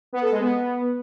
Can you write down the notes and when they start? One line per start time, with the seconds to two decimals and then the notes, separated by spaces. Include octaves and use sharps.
0.12 B3
0.22 A4
0.31 G#3
0.41 B3